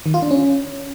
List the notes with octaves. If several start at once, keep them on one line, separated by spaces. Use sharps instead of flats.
D#3
F4
D4
C#4